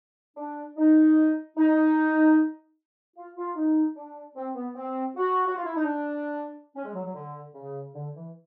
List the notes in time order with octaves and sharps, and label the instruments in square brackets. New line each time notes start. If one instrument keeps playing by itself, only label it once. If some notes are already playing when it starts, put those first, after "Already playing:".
[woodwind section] D4
D#4
D#4
F4
F4
D#4
D4
C4
B3
C4
F#4
F#4
F4
E4
D#4
D4
C#4
G#3
F#3
F#3
D3
C#3
D3
E3